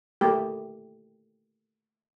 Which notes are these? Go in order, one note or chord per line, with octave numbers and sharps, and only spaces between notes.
A3 A#3 G4